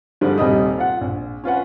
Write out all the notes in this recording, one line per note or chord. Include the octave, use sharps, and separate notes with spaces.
G#2 D3 F3 G3
D#1 C3 G3 D#5 D#6
F4 F#5
A#1
C#4 F4 B4 F#5